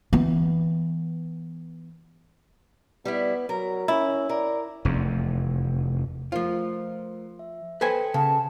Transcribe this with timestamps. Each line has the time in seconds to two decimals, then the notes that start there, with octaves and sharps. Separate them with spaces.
0.13 E3 B3
3.05 G3 B3 E4
3.49 F#3 A#4
3.88 C#4 E4
4.29 A#4 D5
4.85 F1 E2
6.32 F3 A3 F4 A#4 C5
7.39 E5
7.81 A4 B4 C5 G5 G#5 C#7
8.14 C#3 A5